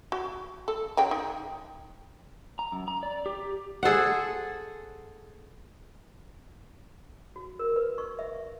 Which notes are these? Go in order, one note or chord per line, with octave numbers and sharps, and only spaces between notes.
F#4
A4
C#3 F#3 G5
D#4
A#5
F#2
A#5
D5
G4
G#4 A4 C5 F#5
F#4
A#4
B4
C#6
E5